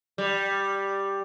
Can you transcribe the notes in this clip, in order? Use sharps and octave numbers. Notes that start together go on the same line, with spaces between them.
G3